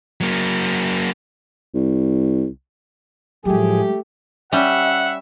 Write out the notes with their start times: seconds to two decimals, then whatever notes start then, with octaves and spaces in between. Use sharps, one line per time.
0.21 F#3 A#3
1.74 C2
3.45 A2 F3 F#3 G#3 A3 G4 G#4
4.52 G3 C#4 E5 F#5